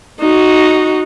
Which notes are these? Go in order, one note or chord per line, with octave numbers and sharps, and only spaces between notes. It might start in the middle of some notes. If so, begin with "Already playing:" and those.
D#4 F#4